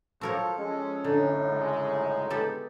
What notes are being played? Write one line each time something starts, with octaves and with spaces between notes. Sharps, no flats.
F3 F#3 F#4 A4 A#4 C#5
F3 G#3 C#4
F#2 A2 D3 D4 D#4
C#3 G3 G#3
D#4
B3 G4 A4